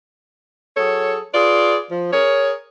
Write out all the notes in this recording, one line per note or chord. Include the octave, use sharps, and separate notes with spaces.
F#3 G#4 A4 C#5
F4 G#4 B4 D5
F3
G#4 A#4 C#5